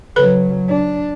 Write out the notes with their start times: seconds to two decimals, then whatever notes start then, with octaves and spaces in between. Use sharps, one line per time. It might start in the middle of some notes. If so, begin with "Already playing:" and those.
0.16 C#3 F#3 A4 B4 B5
0.69 D4